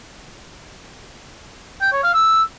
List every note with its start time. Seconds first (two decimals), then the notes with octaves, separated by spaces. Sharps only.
1.82 G5
1.92 C#5
2.03 F5
2.14 E6